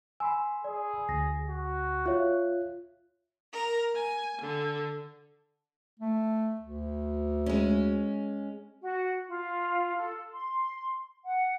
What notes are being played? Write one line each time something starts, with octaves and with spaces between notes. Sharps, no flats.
G#5 B5 C6 E6
G#4 D5
D2 A#6
F#4
F4 C#5 E5 F#6
A#4
G#5
D3
A3
D2
G#3 C#4
F#4
F4
A4
C6
F#5